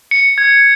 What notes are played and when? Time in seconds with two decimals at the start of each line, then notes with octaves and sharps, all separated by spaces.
0.11 C#7
0.38 G#6